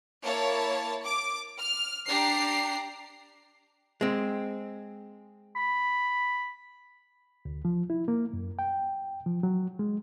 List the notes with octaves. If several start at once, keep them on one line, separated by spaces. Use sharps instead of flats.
A#3 E4 C#5 A5
D6
F6
D4 G4 A#5 C7
G#3 C4
B5
D2
F3
E4
A#3
F#2
G5
F3
F#3
G#3